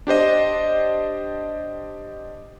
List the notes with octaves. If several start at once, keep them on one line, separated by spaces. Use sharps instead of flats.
D4 G4 C5 D#5